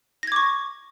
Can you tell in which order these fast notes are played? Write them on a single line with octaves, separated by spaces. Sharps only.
A#6 G#6 D6 C#6